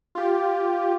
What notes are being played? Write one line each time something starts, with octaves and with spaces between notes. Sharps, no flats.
F4 G4